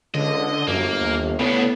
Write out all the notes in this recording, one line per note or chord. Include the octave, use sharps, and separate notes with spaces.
C#2 D3 D#5
G1 F#2 A#3
D#2
A2 C#3 B3 D4